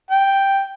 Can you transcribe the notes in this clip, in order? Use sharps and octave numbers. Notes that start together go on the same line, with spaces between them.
G5